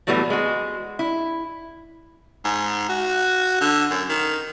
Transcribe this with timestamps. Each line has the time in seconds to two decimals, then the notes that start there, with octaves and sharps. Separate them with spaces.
0.07 A2 E3 F#3 G3 A3 B3
0.30 G#3 F#4
0.99 E4
2.45 G#2
2.89 F#4
3.61 D3
3.90 F#2
4.09 D#3